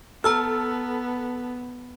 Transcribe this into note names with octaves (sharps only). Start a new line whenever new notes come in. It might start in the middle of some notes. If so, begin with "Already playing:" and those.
B3 A4 A#5 E6 F6